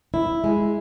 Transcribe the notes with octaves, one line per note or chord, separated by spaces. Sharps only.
E4
G#3